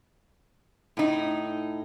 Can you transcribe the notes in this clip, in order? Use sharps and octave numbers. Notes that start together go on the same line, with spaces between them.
A2 D#4